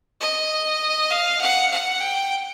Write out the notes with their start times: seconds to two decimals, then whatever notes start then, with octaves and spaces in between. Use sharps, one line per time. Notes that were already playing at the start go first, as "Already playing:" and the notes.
0.21 D#5
1.11 F5
1.41 F#5
1.71 F#5
2.01 G5